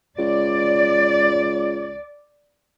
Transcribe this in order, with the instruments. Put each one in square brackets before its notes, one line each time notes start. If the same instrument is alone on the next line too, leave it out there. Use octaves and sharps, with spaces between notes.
[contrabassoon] C#2 [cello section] D5